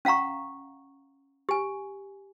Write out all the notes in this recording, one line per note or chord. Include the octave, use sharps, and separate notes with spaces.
C#4 F5 F#5 A#5 C#6
G4 G#5